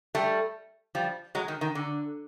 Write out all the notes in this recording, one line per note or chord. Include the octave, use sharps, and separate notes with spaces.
G3 A3
F3 G3
F#3 G#3
D#3
D#3
D3